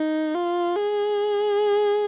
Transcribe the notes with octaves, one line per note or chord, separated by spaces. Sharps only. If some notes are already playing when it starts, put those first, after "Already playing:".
Already playing: D#4
F4
G#4